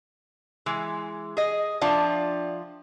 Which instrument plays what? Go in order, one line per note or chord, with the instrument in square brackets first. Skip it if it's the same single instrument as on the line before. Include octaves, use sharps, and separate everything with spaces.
[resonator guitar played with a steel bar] E3 G#3
G#4 D#5
[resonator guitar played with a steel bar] F3 D4 F4 [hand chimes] D5 E5 G5